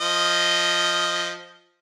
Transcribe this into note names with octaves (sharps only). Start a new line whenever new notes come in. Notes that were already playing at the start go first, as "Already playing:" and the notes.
F3 D#5